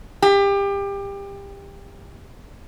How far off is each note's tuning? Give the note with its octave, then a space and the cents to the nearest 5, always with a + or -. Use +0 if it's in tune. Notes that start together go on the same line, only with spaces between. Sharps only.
G4 +25